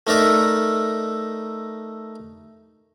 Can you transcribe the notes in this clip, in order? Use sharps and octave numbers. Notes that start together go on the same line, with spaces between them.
A3 D#4 A#4 D5 E5